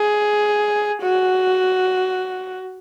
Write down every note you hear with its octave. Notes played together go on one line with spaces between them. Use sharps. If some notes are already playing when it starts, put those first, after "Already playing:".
Already playing: G#4
F#4